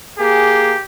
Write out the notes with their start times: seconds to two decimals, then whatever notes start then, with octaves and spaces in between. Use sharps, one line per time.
0.19 A#3 G4 G#4